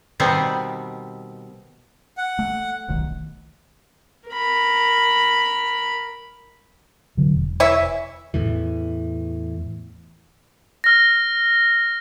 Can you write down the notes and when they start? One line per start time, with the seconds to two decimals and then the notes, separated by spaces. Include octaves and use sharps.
0.20 B2 D#3 G3 B3 C4
2.17 F#5
2.39 A3
2.88 D#1 B1 D#3
4.29 A#4 B5
7.17 D3 F#3
7.34 E1
7.60 E3 C#5 E5
8.34 E2 A2 E3
10.84 F6 A#6